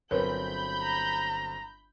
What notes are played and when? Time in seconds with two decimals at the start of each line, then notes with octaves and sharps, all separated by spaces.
0.11 G1 F#3 C4 A#4 B4 C#5 B5 G6
0.82 A#5